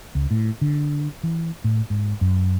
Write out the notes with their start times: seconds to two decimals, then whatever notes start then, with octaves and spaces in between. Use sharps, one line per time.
0.15 C#2
0.31 A2
0.61 D3
1.23 E3
1.64 A2
1.90 G#2
2.21 F#2